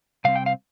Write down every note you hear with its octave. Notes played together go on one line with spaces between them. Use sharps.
C3 G3 C4 F5
G5
F5